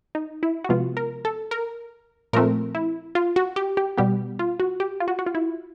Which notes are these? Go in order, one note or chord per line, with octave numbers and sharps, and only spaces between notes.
D#4
E4
F#4
C3 F3 G#3 B3 F4
A#4
A4
A#4
A#2 F3 A3 C4 A#4
E4
F4
F#4
G4
G4
B2 G3 B3 G4
F4
F#4
G4
F4
F#4
F#4
F4
E4